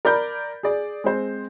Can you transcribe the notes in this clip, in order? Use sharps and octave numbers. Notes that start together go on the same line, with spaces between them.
A#4 D5 B5 G6
G#4 D5
G#3 C4 C5